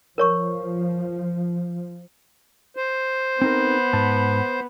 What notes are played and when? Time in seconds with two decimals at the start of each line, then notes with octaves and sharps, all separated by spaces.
0.18 F3 A#4 C#5 C#6
2.76 C5
3.42 B3 C4 D#4 A#4
3.93 G#2 A5